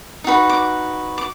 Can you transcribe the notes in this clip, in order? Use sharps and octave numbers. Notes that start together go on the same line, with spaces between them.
D#4 F#4 B4
D6
D6